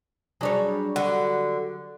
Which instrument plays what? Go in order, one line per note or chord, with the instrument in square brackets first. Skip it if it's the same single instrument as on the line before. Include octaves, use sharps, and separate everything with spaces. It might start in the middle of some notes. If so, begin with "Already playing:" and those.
[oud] F#3 G3 C#5 [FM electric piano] D4 G#4
[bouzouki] D3 [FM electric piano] F#4